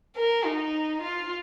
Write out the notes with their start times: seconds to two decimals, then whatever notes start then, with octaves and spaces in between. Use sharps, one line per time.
0.17 A#4
0.45 D#4
1.02 F4